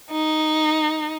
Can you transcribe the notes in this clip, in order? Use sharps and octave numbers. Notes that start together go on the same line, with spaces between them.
D#4